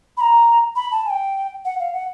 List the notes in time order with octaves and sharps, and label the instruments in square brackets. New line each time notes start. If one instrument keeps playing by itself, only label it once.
[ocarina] B5
A#5
B5
A5
G#5
G5
F#5
F5
F#5